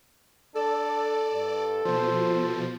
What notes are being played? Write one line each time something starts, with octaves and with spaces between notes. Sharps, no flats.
D4 A4 D5
G2
B2 F3 C5